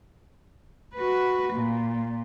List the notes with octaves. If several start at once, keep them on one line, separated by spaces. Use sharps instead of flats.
F#4 B4
A#2